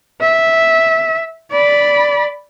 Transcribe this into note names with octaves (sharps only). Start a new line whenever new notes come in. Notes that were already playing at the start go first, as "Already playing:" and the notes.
E5
D5 B5